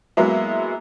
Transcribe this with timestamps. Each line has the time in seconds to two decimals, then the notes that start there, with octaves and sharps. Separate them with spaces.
0.17 F#3 G#3 A#3 B3 E4